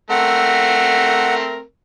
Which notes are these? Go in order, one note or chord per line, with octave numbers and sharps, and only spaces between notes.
A3 C4 A#4 F#5